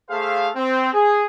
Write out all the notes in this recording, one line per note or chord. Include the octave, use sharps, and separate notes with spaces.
A3 G#4 A4 C5 E5 F5
C4
G#4